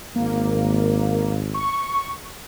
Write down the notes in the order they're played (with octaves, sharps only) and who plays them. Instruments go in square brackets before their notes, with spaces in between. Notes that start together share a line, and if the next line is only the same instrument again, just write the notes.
[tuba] G#1 [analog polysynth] A#3
[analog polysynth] C#6